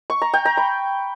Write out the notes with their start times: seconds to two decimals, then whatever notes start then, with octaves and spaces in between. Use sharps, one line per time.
0.10 C#6
0.22 A#5
0.34 G5
0.45 A#5
0.57 B5